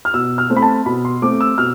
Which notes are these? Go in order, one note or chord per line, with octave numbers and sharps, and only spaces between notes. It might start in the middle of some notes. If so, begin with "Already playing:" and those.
F6
B2 E6
F6
A3 C4
B5
A5
B2 B5
C6
A3 C4 D6
E6
B2 F6